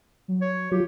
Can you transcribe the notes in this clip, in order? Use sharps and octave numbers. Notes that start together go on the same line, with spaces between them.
F#3
C#5
F#3 F4 G4